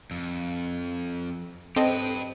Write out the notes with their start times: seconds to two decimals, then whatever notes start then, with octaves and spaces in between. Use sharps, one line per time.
0.11 F2
1.76 C4 G4 A4 B4 D#5